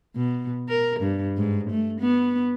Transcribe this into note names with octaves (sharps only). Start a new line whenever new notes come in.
B2
A#4
G2
G#2
A3
B3